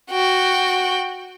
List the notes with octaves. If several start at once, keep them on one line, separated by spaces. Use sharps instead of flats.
F#4 G5